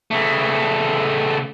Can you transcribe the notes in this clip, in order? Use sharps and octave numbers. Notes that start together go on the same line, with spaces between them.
C#3 A3